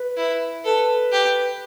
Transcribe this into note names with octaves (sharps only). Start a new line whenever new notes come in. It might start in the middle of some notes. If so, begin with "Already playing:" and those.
Already playing: B4
E4
A4 B4
G4